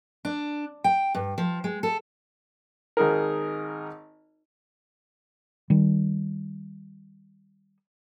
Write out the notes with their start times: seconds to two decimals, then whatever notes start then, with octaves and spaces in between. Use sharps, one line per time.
0.25 D4
0.84 G5
1.15 G2
1.38 F3
1.64 G#3
1.83 A4
2.97 G#1 D#4 G#4 A#4
5.70 D#3 G3